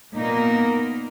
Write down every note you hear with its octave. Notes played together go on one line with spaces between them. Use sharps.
A#2 A#3 B3 D#4 A#4